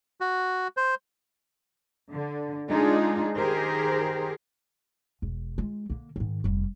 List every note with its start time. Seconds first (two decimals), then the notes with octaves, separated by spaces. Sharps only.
0.21 F#4
0.77 C5
2.12 D3
2.68 G#3 D4 D#4 F4 G#4
3.36 D#3 G4 G#4 A#4 C5
5.22 E1
5.58 G#3 F4
5.90 D3 A#3
6.16 G#2 D#3
6.44 F1 G3